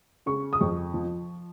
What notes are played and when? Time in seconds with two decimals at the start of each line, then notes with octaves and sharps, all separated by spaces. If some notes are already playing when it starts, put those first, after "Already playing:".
0.26 C#3 C#6
0.53 D#6
0.61 F2 C#6
0.94 F3